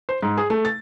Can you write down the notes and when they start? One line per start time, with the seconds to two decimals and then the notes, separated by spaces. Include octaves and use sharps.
0.09 C5
0.23 G#2
0.37 G#4
0.50 A3
0.65 A6